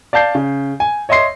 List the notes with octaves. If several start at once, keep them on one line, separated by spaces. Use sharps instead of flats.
D5 F5 A5 G6 C7
C#3
G#5
C#5 D#5 E5 C6 C7